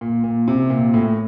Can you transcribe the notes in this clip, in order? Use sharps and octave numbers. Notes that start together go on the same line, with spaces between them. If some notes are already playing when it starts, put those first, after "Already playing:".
A#2
A#2
C3
A#2
A2